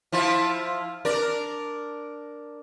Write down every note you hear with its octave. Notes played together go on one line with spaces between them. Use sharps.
F3 E4 F4
D4 A#4 D5